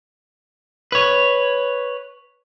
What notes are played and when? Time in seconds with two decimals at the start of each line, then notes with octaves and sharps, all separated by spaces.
0.92 B4 C#5